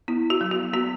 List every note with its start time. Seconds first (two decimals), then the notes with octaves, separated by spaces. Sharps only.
0.08 B3 E4
0.30 F#4
0.41 F#3
0.51 F#4
0.73 B3 F#4